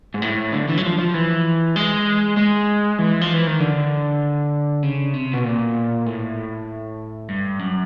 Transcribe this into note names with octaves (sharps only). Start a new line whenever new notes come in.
G#2
A2
D3
E3
F#3
F3
F3
E3
G#3
G#3
E3
F3
E3
D#3
D3
C#3
C3
B2
A#2
A2
G2
F#2